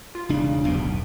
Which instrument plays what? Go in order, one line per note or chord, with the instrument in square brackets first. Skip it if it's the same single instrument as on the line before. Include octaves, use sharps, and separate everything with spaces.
[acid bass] F4
[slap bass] E1 D4 [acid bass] C#3
[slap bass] D1 B1 B2 [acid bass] E2